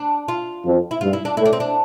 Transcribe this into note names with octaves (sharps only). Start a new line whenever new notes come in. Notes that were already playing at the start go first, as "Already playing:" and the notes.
Already playing: D4
F4
F2 F3
E4
G2 G3 F4
E4
D4
A2 A3 E4
D4
C4
D4